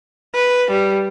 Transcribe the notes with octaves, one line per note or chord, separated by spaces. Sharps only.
B4
G3